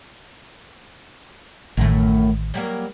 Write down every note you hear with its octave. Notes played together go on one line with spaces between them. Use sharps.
A1 F#2 A2 D#3 A3
F#3 G3 A#3